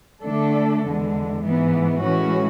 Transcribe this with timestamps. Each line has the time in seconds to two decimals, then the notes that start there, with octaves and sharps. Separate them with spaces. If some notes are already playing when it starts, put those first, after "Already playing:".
0.24 D3 A3 D4 A4
0.82 E2 D3 G#3
1.43 G#2 E3 B3
2.02 A2 E3 G#3 C#4 F#4